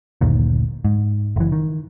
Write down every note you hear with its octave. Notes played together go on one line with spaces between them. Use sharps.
F#1 D2 A#2 D#3
G#2
F#1 E3
D#3